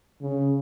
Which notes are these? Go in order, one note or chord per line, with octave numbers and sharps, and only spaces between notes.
C#3